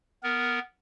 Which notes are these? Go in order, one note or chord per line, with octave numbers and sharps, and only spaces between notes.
B3 A#4